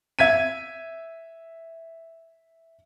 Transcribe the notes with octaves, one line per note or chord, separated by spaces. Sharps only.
E5 G#6 B6 D#7